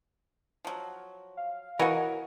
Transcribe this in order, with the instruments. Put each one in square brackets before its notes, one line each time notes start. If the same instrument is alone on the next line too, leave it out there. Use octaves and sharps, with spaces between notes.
[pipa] F3 F#3
[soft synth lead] F5
[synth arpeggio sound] E3 [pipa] F#4 C#5 D#5 [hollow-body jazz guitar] A#4 F#5